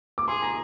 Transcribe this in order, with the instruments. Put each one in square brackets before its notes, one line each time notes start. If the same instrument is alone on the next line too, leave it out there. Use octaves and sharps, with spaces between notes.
[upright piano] D6
[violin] G#4 [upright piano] C6
[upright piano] A#5